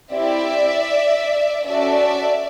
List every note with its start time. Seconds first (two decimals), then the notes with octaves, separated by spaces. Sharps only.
0.13 C4 E4 G4 D5 E5
1.67 C#4 F#4 A4 D5 E5